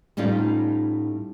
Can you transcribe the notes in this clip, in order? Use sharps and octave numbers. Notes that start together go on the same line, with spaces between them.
A2 G3 C#4 D#4 F4